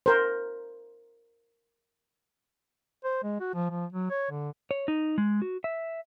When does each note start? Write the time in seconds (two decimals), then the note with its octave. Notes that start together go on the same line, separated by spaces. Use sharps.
0.06 A#4 C5
3.04 C5
3.23 G#3
3.40 F#4
3.54 F3
3.70 F3
3.93 F#3
4.10 C#5
4.31 D3
4.71 C#5
4.88 D#4
5.18 G#3
5.42 F#4
5.64 E5